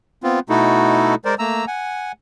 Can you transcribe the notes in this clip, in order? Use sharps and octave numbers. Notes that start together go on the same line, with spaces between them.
B3 C4 F4
B2 A3 D#4 E4 F#4 A4
G#3 A#4 C5 D5
A3 A#3 A#5 E6
F#5 G#5